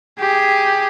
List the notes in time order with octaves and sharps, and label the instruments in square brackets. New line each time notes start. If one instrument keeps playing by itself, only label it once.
[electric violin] G4 G#4